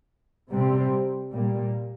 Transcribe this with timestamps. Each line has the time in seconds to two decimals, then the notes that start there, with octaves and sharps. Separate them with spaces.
0.50 C3 G3 C4
1.32 A#2 G3 A#3